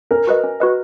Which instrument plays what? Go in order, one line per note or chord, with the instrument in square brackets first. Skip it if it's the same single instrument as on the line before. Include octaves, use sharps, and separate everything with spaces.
[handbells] C#4 [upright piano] A#4
[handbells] F#4 B4 D#5
C#4
F#4 B4 D#5